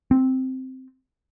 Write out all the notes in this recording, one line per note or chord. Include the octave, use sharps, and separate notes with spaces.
C4